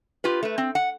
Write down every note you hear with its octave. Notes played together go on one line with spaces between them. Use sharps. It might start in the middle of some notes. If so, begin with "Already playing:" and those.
F4 G4 B4
A3 B4
C4
F#5